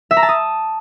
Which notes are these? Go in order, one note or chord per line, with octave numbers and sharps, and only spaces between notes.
E5
A#5
A5
D#6